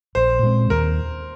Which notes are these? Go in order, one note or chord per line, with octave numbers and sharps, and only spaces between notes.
A#1 C5
A#2 G#3 C4
D#2 A#4